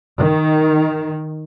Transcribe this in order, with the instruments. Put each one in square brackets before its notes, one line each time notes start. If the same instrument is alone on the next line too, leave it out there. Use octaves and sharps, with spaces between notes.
[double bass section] D#3